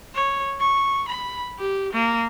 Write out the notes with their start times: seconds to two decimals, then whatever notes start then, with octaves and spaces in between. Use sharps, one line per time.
0.15 C#5
0.60 C#6
1.09 B5
1.59 G4
1.93 A#3